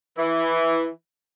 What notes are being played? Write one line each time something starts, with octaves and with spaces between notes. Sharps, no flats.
E3 E4